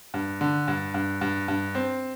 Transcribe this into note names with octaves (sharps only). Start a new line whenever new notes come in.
G2
D3
G2
G2
G2
G2
C4